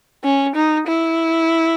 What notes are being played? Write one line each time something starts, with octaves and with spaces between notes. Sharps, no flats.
C#4
D#4
E4